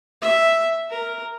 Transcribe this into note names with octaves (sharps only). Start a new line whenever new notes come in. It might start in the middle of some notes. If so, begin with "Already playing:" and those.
E5
A#4